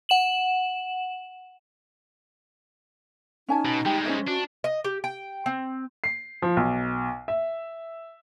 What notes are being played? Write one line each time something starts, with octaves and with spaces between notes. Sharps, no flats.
F#5 E7 F#7
C#4 D#4 G#5 A5
B2
G3 G#3 G4
C#4 C5 E5
D4 F#4
D#5
G4
G5
C4
C7
F3
B1
E5